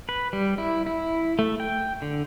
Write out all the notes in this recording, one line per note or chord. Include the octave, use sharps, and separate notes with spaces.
B4
G3
E4
E4
A3
G5
D3